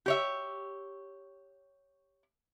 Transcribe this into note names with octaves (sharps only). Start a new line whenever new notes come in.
G4 C#5 E5